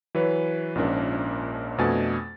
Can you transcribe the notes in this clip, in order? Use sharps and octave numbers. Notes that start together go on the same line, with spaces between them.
E3 F#3 B4 C#5
A#1 G#2 F3 C#4 D4 A#4
F2 B2 A3 D4 G#5 A6